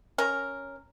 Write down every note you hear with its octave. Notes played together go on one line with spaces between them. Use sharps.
C#4 A#4